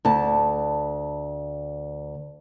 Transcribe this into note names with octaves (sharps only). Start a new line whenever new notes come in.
D2 A5